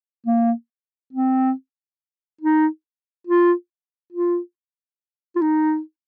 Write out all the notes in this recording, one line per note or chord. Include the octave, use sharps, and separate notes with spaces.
A#3
C4
D#4
F4
F4
F4
D#4